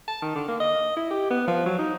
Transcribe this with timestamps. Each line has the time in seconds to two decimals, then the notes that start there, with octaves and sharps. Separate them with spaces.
0.08 A5
0.22 D#3
0.35 D3
0.48 A#3
0.60 D#5
0.96 E4
1.11 G4
1.30 B3
1.47 F3
1.66 F#3
1.78 D#4